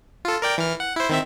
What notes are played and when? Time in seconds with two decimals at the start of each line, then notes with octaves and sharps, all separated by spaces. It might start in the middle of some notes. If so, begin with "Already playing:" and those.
0.25 F4 A4
0.42 A#4 D5 G5
0.58 E3 F6
0.80 F#5
0.96 E4 C5
1.09 D#3 C4 E5